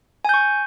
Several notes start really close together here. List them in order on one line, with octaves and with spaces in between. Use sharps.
G#5 G6 C#6